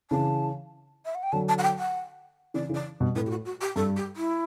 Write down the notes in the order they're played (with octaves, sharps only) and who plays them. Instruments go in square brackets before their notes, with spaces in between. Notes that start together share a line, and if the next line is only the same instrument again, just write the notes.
[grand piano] C#3 E3 [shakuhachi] A5
[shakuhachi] E5
F#5
G5
[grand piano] D3 F#3 [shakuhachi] A5
[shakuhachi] A5
F#5
G5
F#5
[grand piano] C#3 E3 [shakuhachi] D5
[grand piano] C#3 E3
[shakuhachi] D5
[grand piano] G2 B2
[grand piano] A2 [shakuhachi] B4
[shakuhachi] G4
F#4
F#4
G4
[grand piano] G2 [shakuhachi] A4
[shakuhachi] G4
E4